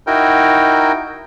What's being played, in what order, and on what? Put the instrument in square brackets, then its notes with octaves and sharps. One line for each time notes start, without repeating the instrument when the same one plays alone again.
[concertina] D#4 E4 F#4 A#4 G5